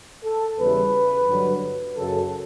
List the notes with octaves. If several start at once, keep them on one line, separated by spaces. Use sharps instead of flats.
A4
E2 C#3 E3 G3 B4
G2 D3 F#3
F#2 C#3 F#3 A4